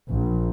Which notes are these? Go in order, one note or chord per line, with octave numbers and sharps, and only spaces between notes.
A#1